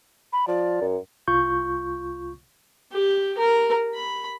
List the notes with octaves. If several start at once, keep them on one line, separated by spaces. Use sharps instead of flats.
B5
F3 D5
F#2
C2 F4 C#6 G6
G4
A#4
B5